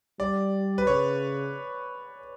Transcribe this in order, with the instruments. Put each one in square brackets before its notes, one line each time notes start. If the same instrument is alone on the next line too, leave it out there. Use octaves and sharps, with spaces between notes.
[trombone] G3 [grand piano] D5
[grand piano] B4
[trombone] C#3 [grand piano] C#5